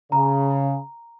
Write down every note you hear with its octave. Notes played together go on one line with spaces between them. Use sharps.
C#3 A#5